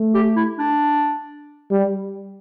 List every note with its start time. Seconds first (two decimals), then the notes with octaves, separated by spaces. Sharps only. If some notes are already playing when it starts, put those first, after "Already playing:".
Already playing: A3
0.14 G4
0.36 E4
0.59 D4
1.71 G3